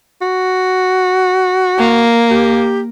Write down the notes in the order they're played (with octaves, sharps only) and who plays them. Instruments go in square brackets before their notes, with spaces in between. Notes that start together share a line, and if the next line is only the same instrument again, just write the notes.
[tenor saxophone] F#4
[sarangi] A#3
[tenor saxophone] G4